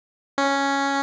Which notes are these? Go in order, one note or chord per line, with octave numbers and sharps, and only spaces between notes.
C#4